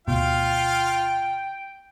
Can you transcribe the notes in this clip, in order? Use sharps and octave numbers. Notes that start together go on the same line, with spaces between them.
D2 B2 F4 F5 G5